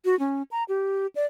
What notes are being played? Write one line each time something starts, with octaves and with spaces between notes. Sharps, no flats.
F#4
C#4
A#5
G4
D5